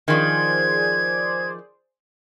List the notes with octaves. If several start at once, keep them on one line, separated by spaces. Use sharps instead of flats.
D#3 F3 G#4 C5 D5 G#6